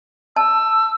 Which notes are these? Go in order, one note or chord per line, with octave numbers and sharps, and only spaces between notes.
A5 E6